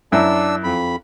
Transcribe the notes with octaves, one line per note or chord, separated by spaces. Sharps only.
F#2 D4 E4 E6
F2 B5